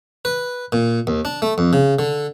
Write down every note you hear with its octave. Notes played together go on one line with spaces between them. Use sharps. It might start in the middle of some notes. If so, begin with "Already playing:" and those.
B4
A#2
D#2
D4
A3
F2
C#3
D3